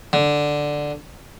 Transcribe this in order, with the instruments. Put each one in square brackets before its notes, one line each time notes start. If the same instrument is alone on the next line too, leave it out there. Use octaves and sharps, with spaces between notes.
[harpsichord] D3